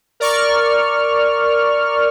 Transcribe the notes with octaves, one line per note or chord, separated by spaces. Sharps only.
A#4 D5 C#6 F6